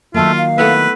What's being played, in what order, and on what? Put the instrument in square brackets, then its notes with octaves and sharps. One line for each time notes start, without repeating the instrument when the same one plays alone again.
[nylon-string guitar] D#3 F#3 A#3 [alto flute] A3 [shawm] F4
[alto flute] F5
[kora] A3 B3 E4 [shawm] B4